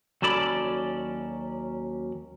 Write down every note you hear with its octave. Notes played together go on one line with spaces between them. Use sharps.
D#2 F#3 C#4 A4 D5 B5